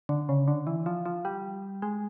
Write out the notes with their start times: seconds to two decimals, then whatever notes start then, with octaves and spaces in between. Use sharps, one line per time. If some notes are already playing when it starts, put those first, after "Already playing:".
0.09 D3
0.29 C#3
0.48 D3
0.67 E3
0.86 F3
1.06 F3
1.25 G3
1.82 G#3